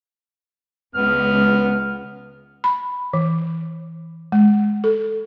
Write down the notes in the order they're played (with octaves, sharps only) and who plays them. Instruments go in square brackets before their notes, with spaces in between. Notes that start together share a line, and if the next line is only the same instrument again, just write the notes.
[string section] C#2 [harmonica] B3 F6
[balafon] B5
E3
G#3
A4